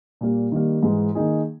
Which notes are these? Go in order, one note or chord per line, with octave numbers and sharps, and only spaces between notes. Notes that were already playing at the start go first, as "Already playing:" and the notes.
A#2 G3 A#3
D#3 G3 A#3
G#2 E3 G#3
D#3 A#3 D#4 G#4